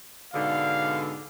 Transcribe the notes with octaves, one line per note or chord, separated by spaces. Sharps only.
G#2 B2 D3 F5